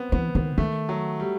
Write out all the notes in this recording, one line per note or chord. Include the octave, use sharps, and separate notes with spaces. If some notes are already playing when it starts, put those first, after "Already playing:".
Already playing: B3 C4
E3 B3
D#3 B3
D#3 A3
F#3
G3